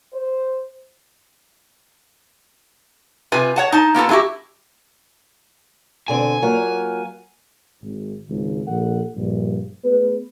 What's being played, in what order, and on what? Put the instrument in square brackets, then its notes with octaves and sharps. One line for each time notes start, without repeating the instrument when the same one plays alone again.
[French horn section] C5
[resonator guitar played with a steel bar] C3 F4 B4 G#5
C#5 F#5 A5
D#4 A5
A#3 B3 F4 A4
G#3 A3 E4 F#4 G4
[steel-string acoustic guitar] B2 D3 C4 [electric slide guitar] G#5
[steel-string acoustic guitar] F#3 A#3 F4
[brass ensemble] G#1
G#1 C#2 G#2 D#3
A#1 A4 F#5
A#1 G2
A3 B3 G#4 B4